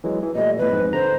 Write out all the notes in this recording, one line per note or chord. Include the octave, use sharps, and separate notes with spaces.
E3 F#3 G#3
E3
A#2 G3 A3 D#5
E2 A2 B4
F2 G#2
D3 C5 A#5